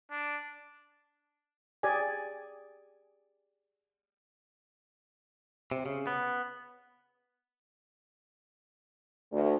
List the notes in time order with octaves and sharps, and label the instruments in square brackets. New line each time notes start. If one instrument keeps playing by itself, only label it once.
[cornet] D4
[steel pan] G4 G#4 C#5 D5 G#5
[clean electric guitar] C3
C#3
B3
[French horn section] D2